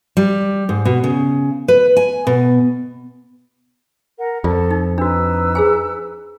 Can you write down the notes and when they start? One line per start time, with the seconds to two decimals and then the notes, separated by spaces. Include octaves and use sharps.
0.17 G3
0.69 G#2
0.85 B2
1.04 C#3
1.68 B4
1.97 G#5
2.27 B2
4.18 A#4 F#5
4.44 F2 F4 A4 D5
4.71 D#4
4.98 D4 D#4 F#4 B4 E6
5.55 G#4 C5 G#5